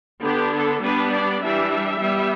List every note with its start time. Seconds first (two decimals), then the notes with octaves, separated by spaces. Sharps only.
0.23 D3 B3 D4 G4
0.54 A4
0.83 G3 B3 D4 B4
1.13 D5
1.42 E3 G3 D4 E5
2.02 G3 B3